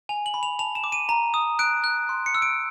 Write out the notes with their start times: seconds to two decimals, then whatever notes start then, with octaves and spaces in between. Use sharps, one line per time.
0.09 G#5 F7
0.26 F#7
0.34 B5
0.43 F7
0.59 A5 F7
0.75 E7
0.84 D6
0.92 D#7
1.09 A#5
1.34 D#6
1.59 F#6 D7
1.84 F#6
2.09 C6
2.26 C#7
2.35 E6
2.42 D7